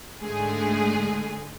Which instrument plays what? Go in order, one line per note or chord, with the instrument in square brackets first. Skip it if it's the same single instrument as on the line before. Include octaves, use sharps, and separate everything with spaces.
[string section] G#2 D3 G#3 A3 G#4